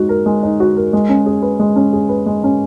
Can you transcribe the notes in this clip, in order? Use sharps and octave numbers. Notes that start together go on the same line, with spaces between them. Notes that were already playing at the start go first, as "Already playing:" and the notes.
Already playing: G#3 D#4 F#4
A#4
G#3
D#4
F#4
A#4
G#3
C#4
G#4
B4
G#3
C#4
G#4
B4
G#3
C#4